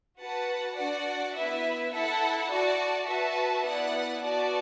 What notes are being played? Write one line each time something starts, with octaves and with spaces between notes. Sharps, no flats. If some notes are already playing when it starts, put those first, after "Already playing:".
F#4 B4 F#5 A5
D4 F#4 D5 F#5
B3 E4 B4 E5
E4 A4 F#5 A5
F#4 D5 A5
F#4 B4 E5 A5
B3 E4 D5 F#5
B3 F#4 D5 A5